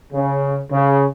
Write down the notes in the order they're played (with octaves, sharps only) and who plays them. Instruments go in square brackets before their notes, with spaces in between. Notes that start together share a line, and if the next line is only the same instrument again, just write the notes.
[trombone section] C#3
C#3